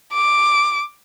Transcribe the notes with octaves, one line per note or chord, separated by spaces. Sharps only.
D6